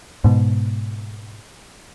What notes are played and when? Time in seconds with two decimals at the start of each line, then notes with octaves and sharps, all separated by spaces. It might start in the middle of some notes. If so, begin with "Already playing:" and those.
0.24 G#2 B2